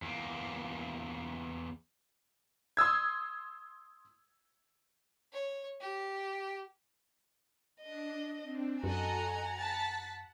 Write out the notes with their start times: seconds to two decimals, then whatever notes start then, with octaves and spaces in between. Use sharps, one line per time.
0.02 E2 A#3
2.77 C6 D#6 E6 G#6
5.33 C#5
5.81 G4
7.81 D4 D#5
8.42 C4 D4
8.84 F#2 F#4 A4 D#5 F#5 G#5 A#5
9.58 A5 A6 B6